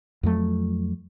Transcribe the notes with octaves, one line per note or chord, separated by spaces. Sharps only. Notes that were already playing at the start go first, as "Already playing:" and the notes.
F2 F#3 A3